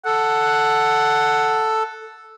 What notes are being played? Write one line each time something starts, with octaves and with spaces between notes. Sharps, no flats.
A4 F#5